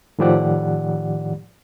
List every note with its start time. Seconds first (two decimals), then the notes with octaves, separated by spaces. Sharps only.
0.19 A2 D#3 F3 G4 D5 F#5